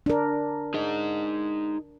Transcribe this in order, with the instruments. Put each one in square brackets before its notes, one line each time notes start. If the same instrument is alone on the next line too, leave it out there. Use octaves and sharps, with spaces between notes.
[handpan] D4 A#4
[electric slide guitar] D#4 G#4 D#5